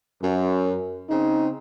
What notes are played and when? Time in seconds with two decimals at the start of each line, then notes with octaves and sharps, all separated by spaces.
0.22 F#2
1.09 C#3 C4 D#4